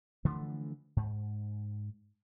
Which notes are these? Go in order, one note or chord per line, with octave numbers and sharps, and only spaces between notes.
D3 E3 F3 A3
G#2